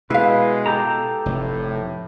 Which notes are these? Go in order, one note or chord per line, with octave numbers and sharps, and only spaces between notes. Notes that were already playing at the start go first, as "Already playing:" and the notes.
B2 G#3 E4 B4 F5
G4 A4 A#5
F1 A2